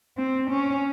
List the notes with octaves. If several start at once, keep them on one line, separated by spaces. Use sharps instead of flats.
C4
C#4